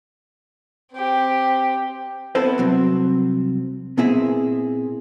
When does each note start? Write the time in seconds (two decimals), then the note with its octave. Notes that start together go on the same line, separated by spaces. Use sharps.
0.92 C4 G4
2.35 B3 C4 E4 A4 B4 C5
2.58 C2 F#3 C4
3.97 A#2 B3 C4 E4 G#4 E5